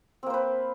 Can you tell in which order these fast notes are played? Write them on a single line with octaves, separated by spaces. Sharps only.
C4 A#3 C5 B4